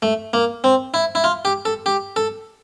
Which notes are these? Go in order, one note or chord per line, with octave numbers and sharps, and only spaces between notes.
A3
A#3
C4
E4
E4
F4
G4
A4
G4
A4